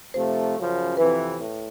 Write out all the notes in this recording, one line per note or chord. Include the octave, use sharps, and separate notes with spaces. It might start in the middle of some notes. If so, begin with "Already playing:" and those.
C3 F3 A3 C5
F#2 C#3 F3
F2 C3 E3 B4
A2